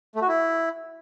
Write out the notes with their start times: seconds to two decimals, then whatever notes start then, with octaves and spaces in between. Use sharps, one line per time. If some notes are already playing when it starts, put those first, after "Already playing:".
0.15 A3
0.22 F#4
0.28 E4